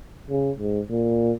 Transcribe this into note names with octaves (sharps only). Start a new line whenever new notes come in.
C#3
G#2
A#2